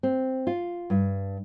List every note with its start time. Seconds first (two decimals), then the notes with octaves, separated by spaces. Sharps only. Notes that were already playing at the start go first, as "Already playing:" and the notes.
0.03 C4
0.47 F4
0.90 G2